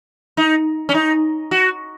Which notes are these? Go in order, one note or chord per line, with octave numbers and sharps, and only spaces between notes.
D#4
C#4
D#4
F#4